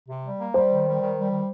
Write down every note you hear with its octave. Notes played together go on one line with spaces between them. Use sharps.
C3
G3
A#3
G3 C5
D#3
G3
D#3
G3
D#3